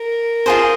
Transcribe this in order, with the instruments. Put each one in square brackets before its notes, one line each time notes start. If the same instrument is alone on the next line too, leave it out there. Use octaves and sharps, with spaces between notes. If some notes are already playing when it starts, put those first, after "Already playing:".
Already playing: [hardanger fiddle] A#4
[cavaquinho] F4 G#4 C5